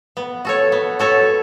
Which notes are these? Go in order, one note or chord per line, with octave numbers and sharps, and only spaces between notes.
B3
F#4 A4 C#5
B3
F#4 A4 C#5